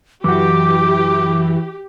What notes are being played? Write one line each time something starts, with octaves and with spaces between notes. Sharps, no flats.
F#2 E3 F#4 G4 D6